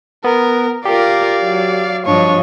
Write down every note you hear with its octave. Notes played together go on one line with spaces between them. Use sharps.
B3 A#4
F4 G4 A#4 D5 F5
F#3
G2 F3 D4 C#5 D#5